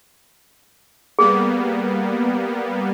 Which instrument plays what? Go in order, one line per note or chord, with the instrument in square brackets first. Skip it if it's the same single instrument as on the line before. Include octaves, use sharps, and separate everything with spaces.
[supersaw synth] G3 A#3 B3 [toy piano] G#4